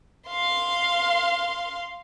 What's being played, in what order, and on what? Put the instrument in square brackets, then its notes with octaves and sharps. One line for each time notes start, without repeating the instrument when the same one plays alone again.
[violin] F5 C6